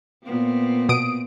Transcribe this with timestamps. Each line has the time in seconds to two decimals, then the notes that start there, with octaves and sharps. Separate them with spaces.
0.23 A#2 B3 C4
0.89 B2 D#6 D7